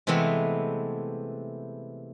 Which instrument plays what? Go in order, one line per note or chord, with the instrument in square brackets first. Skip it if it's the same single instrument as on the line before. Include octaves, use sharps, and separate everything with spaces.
[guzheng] C3 E3 G#3 A3 B3 C4